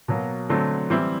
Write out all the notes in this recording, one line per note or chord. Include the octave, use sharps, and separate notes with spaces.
B2 F#3 A#3
D3 F#3 A3 C4
E3 G3 C4 E4